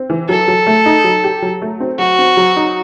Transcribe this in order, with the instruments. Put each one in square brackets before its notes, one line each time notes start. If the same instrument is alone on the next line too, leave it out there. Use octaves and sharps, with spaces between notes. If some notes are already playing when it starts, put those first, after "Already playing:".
Already playing: [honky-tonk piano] C4
E3
[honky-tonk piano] F#3 [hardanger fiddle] A4
[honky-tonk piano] F#3
A3
D#4
F#3
G4
F#3
A3
C4
[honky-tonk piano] F#3 [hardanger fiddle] F#4
[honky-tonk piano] C4
F#3
D#4